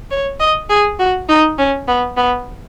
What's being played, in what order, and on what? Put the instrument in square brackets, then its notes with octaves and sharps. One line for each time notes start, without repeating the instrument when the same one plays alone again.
[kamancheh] C#5
D#5
G#4
F#4
D#4
C#4
B3
B3